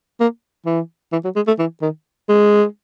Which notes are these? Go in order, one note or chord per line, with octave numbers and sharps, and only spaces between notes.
A#3
E3
E3
F#3
G#3
A3
E3
D#3
G#3